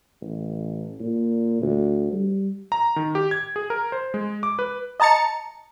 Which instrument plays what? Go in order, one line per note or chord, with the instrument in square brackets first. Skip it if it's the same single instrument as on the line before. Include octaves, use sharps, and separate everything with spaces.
[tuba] A1
A#2
D2
G3
[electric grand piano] A#5
D#3
G4
G#6
G#4
A#4
C5
G#3
D6
B4
[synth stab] D#5 A5 A#5 A6 C#7